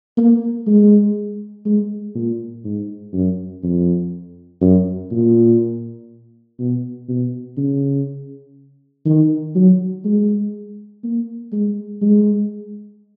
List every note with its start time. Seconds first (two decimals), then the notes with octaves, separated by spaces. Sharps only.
0.17 A#3
0.67 G#3
1.66 G#3
2.15 A#2
2.64 G#2
3.13 F#2
3.63 F2
4.61 F#2
5.12 A#2
6.59 B2
7.09 B2
7.57 C#3
9.06 D#3
9.55 F#3
10.05 G#3
11.04 A#3
11.52 G#3
12.02 G#3